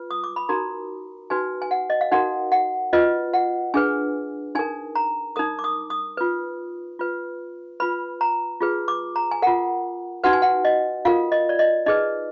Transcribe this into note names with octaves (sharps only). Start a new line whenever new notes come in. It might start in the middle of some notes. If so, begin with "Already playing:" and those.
Already playing: F4 B4
D#6
D6
B5
D#4 F#4 A#4 A#5
D#4 F#4 B4 G#5
G#5
F#5
D#5
F5
D#4 F#4 A#4 F#5
F#5
F4 B4 D#5
F#5
D4 G#4 B4 G#5
D#4 A#4 G#5
A#5
D#4 A#4 D#6
D6
D#6
D#6
F4 B4
F4 B4
F4 B4 B5
A#5
F4 G#4 B4
D6
A#5
G#5
F4 A#4 F#5
D#4 F#4 B4 F#5
G#5
F#5
D#5
F4 A#4 F5
D#5
D5
D#5
D#4 G#4 B4 D#5